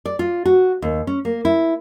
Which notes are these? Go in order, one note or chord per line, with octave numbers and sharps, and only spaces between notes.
D5
F4
F#4
D#2
C#4
A#3
E4